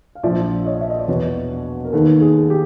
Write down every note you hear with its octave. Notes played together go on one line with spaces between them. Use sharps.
F5
A#1 A#2 F3 D5 E5
C#5 D#5
E5
D#5
D5
E2 B2 B4 C#5
A#4
D#2 D#3 A4 B4
G#4
G4